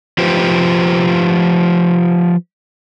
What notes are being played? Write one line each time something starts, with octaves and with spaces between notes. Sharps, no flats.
F3 F4 G4 B4 C5